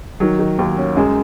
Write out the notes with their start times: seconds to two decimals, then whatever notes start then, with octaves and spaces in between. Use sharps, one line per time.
0.20 D#3 F#3
0.39 D#3
0.59 D#2
0.78 C#4
0.97 F#2 G#3